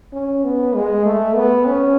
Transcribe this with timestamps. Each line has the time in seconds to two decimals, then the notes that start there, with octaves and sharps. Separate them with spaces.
0.13 C#4
0.45 B3
0.75 G#3
1.06 A3
1.36 B3
1.67 C#4